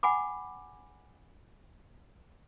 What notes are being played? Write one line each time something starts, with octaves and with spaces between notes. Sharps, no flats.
F#5 G#5 B5 D6